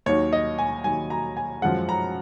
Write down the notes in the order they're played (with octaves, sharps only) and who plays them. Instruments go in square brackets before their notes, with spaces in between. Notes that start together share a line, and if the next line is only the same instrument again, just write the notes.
[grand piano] D#2 D#3 F#3 C#5
D#5
G#5
D#2 D#3 F#3 G#5
A#5
G#5
F#2 F3 G#3 F#5
A#5